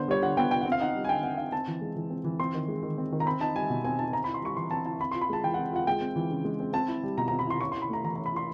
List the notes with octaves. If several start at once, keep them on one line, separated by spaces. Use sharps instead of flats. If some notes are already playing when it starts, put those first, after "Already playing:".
Already playing: D3 B3 C5
G3 C#5
D3 F#5
B3 G5
D3 G5
C4 F#5
F5
D#4 F#5
G3
G#5
D3 G5
C4 F#5
D#4 F5
C4 A5
E3
G#3
E3
C4
E3
C4 C6
D#3
G#3
D#3
C4
D#3
A#5
C4 B5
D#4 A5
G3 G#5
B2
C4 G#5
D#4 A5
C4 A#5
B5
E4
C6
G3 C#6
E3 C6
C4 A5
E4 A5
C4 B5
C6
F4
B5
G#3 A5
E3 G5
F#5
C4
F4 F#5
G#3 G5
C4
E3
C#3
G#3
C4
C4 A5
E4
G3
B2 A#5
A#5
C4
B5
E4 C6
C#4 C#6
C6
E4
B5
A3 A#5
E3 A#5
C#4 A#5
B5
E4 C6